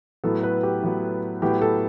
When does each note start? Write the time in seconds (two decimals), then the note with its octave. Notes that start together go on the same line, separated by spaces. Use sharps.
0.24 A2 F#3 B3 A4
0.43 B4
0.63 G4
0.82 A2 F#3 B3
1.42 A2 F#3 B3 G4
1.62 A4